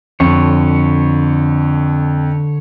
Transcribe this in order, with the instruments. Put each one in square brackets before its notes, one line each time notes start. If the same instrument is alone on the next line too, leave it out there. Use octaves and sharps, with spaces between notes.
[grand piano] F2 [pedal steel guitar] D3 C#5